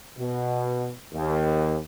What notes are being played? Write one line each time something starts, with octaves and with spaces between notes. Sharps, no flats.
B2
D#2